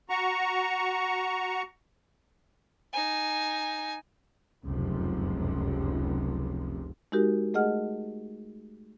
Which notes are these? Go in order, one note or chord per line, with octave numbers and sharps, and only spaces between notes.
F#4 A#5 C#6
D#4 G#5
F1 C#2 F#2 C3 F3
G#3 D#4 F#4 G4 A#4
A3 G#4 D#5 F#5 F6